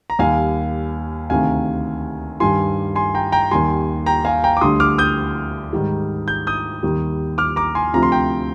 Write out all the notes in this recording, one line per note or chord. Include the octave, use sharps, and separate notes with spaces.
A#5
D#2 D#3 G3 F5 G#5
D2 C3 D#3 F5 G#5
G2 D#3 G3 G#5 C6
G#5 C6
G5 A#5
G5 A#5
D#2 D#3 G3 G#5 C6
G5 A#5
F5 G#5
G5 A#5
D6
D2 D3 G3 C6 D#6
D6 F6
D#6 G6
G#2 D#3 G3
G6
D#6 G6
D#2 D#3 G3
D6 F6
A#5 D6
G#5 C6
D2 C3 F3 A#5
C6
G5 A#5